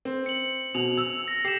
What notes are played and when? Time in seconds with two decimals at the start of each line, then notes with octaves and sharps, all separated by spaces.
0.05 C4
0.26 C#7 F#7
0.75 B2 F7 F#7
0.97 E6
1.28 A#6
1.45 G4 C7 E7